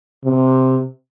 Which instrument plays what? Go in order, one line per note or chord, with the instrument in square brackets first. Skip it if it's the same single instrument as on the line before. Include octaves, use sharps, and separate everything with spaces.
[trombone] C3